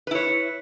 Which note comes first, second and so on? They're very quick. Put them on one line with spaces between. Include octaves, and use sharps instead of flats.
B4 E4 C#5